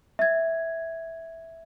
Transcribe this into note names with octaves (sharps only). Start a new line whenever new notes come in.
E5 G#6